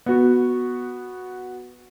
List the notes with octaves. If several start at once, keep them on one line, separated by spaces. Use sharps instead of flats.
B3 F#4